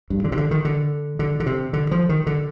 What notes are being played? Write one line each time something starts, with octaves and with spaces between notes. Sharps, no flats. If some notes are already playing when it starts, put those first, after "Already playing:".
G2
D3
C3
D3
D#3
D3
D3
D3
C3
D3
F3
D#3
D3